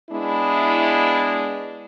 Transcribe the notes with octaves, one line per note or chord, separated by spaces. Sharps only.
G#3 B3 D4 E4